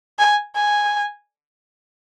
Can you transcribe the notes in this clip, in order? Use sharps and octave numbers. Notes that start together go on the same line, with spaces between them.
G#5
G#5